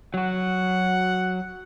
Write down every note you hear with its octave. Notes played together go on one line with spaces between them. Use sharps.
F#3 F#4 F#5